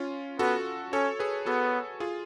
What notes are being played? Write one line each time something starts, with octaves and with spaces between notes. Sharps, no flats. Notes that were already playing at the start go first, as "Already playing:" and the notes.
Already playing: C#4 F4
B3 F#4 A4
C#4 A4 C#5
G#4 B4
B3 F#4 A4
F4 G#4